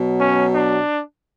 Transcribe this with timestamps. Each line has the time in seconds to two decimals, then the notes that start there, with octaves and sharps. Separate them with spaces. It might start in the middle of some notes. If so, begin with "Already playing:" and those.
Already playing: B2 F#3
0.20 C#4
0.54 D4